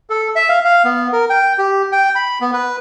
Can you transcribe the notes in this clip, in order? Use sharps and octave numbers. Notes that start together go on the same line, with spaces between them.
A4
E5
F5
F5
B3
A#4
G5
G4
G5
B5
B3
B4